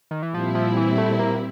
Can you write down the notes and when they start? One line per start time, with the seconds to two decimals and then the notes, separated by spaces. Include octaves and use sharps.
0.11 D#3
0.23 E3
0.34 A#2 F3 G3 C4 E4
0.55 F3
0.77 E3
0.98 A3
1.19 A#3